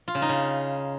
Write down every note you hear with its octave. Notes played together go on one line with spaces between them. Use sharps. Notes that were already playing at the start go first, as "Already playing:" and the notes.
F4
C#3
D#4
C#3